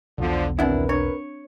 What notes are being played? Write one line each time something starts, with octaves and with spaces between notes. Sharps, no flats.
B1 E2 B2 D3 F3
D#2 C4 D4 E4 A#4 B4 F#5
D4 C#5